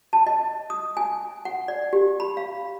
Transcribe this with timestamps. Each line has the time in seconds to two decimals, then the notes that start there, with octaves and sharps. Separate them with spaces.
0.13 A5
0.27 D#5
0.70 D#6
0.97 G#5
1.45 F#5
1.68 D5
1.93 G4
2.20 B5
2.37 F5